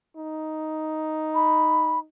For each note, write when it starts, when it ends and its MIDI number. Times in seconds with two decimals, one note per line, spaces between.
0.17 2.05 63
1.35 1.99 83